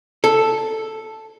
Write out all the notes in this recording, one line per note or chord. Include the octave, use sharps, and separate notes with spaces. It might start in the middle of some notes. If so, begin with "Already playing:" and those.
A4